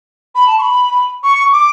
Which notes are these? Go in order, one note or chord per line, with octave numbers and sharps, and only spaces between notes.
B5
A5
C#6
B5
C#6
D6